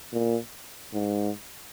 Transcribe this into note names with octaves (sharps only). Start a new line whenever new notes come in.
A#2
G#2